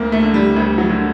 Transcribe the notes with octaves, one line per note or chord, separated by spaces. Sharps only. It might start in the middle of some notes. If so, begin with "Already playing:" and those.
Already playing: D2 A#3
A3
D3
G3
D2 G3
F#3
D3